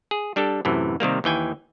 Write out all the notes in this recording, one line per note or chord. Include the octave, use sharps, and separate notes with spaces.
G#4
G3 D4 G4 A4
F#2 A2 C3 E3
C3 D#3 G3 A#3
D#2 E3 G5 G#5